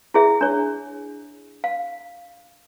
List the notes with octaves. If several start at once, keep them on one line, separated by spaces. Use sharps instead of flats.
E4 G#4 E5
D4 C#5
F5